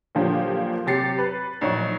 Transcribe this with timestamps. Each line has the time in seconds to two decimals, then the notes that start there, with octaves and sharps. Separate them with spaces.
0.15 A#2 D3 F3 F#3 G4
0.86 C3 F#3 G4 A6 C7 C#7
1.18 B4
1.61 A#1 F#3 D#4 C#6